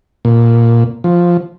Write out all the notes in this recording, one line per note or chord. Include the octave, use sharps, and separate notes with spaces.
A#2
F3